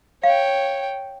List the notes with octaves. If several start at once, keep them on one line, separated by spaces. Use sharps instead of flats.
C#5 F5 G5